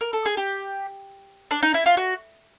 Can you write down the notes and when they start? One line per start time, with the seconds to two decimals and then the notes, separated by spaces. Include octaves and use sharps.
0.01 A#4
0.13 A4
0.25 G#4
0.37 G4
1.51 D4
1.62 D#4
1.74 E4
1.86 F4
1.97 F#4